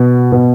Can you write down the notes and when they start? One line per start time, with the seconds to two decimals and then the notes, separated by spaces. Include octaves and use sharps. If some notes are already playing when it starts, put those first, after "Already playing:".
Already playing: B2
0.32 B2